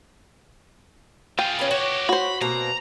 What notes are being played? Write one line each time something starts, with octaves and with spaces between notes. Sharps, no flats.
F4 G#4 G5
C#4 B4
F#4 G4 C#5
F#4 C5 B5
B2 A#3 C4 A#5